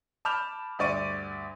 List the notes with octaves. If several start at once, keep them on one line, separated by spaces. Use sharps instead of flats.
A5 B5 D6 F6 G6 F7
D2 G2 D5 C#6 D#7